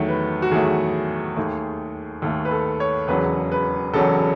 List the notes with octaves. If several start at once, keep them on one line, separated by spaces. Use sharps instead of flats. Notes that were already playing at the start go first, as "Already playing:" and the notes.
Already playing: E2 D#3 F#3 A3
B4
F#4
E2 D#3 F#3 A3 G#4
D#2 D#3 A3
D#2 D#3 A3 A4
B4
A4
C#5
E1 E2 C#3 F#3 B4
B4
E1 E2 C#3 F#3 A4